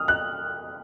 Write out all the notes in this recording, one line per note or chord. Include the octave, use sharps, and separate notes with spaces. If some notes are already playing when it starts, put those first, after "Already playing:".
Already playing: D#6 F6
F#6